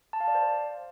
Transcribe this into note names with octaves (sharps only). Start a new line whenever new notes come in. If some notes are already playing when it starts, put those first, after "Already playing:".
A5
F5
D5
C5